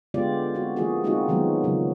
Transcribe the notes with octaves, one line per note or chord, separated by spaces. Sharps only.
D3 G#3 B3 F4 G4 D5
C4 F#4
F3 A#3 E4 F#4 G#4
G#3 A#3 C4 D#4 F4 F#4
D#3 F3 F#3 G#3 B3
C#3 F3 F#3